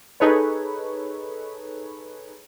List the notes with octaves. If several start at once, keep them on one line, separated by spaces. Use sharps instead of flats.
D#4 G#4 A4 B4 C#5